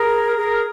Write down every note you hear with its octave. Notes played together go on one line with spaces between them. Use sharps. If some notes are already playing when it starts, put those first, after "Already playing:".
Already playing: G#4 A#4
G#4 A#4